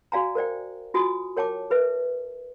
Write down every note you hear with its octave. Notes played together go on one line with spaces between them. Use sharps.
F#4 D5 F5 G#5 A#5
A#4 C5 D5 G5
F4 F#4 G#5 D#6
A#4 C#5 G5 A5 D6
A#4 B4 E5